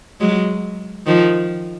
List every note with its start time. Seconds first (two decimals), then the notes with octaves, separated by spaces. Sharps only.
0.20 F#3 G#3
1.06 D#3 F3